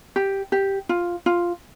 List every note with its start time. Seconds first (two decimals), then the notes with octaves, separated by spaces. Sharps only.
0.16 G4
0.52 G4
0.89 F4
1.26 F4